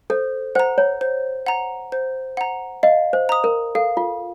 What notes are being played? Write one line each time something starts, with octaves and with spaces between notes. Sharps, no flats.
A4 C5
C5 F#5 A#5
C#5
C5
F#5 A#5
C5
F#5 A#5
D#5 F5
C5
A#5 D#6
A#4
A4 F5
F4